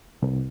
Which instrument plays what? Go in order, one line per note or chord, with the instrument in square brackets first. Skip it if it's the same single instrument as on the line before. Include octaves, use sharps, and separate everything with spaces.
[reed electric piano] C2